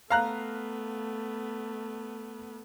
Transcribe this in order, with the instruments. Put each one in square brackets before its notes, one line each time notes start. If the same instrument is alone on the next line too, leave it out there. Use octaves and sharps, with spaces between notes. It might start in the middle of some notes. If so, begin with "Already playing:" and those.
[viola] A3 B3 [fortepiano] F5 A#5 F#6